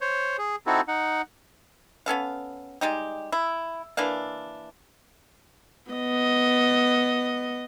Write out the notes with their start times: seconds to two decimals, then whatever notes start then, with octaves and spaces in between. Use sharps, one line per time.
0.01 C5 C#5
0.38 G#4
0.67 C4 D#4 E4 F#4 A4
0.88 D#4 F#5
2.06 B3 C#4 A4 F5
2.81 G3 G#3 D#4 G4
3.32 E4
3.97 E3 A#3 D4 F5
5.91 B3 D#5